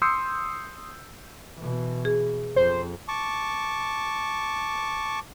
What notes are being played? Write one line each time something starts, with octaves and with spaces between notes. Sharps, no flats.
C6 D#6 E6 G6 C7 C#7
B2 E3
G#4
F2 C5
A5 C#6 D6